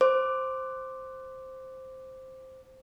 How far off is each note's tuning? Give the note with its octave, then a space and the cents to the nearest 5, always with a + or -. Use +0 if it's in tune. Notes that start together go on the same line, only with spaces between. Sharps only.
C5 +0 D6 +0